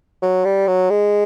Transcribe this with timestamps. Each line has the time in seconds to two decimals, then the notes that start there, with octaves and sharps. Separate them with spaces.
0.23 F#3
0.45 G3
0.68 F#3
0.90 G#3